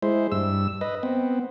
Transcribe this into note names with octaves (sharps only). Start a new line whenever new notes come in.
G#3 E4 C5
G2 E6
B4 D#5
B3 C4